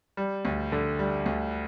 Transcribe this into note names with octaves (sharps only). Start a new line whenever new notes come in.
G3
D2
D3
G3
D2